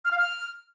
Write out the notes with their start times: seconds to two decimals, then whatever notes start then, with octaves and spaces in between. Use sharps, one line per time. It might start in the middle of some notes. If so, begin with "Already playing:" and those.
0.05 F6
0.12 F5
0.18 F6